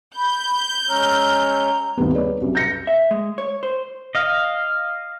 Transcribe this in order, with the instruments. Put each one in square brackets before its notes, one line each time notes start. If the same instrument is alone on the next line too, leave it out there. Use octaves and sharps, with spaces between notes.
[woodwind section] B5 [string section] G6
[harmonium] G#3 C#4 C#5 [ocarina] A#5 [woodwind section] E6 F6
[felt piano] G#1 D#2 G3 B3
G#4 B4 C#5 D5
C2 F#2
G6 A#6 C#7
[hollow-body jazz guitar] E5
G#3
C#5
C5
[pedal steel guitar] D#5 F5